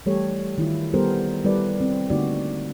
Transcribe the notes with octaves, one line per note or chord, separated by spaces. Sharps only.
E3 G3 A3 G4 A4 C#5
D#3 E4 F4
G3 B3 G4 A4 A#4 C5
G3 E4 A4 B4 D5
C4
D3 A3 A#3 D#4 F#4 D5